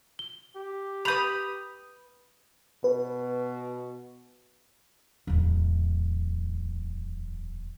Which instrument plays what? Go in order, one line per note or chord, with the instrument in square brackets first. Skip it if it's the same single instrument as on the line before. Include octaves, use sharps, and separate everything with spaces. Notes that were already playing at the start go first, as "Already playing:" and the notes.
[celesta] G7
[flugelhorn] G4
[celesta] B4 G6 F7 [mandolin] B5 D#6
[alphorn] B2 [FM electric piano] B4
[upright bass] D1 E2